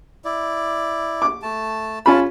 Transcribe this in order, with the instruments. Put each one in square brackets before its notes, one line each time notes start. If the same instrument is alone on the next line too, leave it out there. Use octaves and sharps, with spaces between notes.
[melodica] E4 D5
[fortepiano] D6
[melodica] A3 A5
[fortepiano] C#4 F4 B5 [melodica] F5 A5